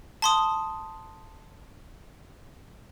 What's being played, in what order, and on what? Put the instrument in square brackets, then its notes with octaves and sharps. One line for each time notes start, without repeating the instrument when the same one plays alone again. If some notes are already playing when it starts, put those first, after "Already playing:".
[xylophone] A5 C6 D#6